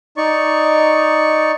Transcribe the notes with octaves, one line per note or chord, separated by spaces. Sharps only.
D#4 D5 C#6